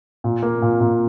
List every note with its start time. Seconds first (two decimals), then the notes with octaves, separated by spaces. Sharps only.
0.24 A#2
0.43 A#3
0.62 A#2
0.80 A#2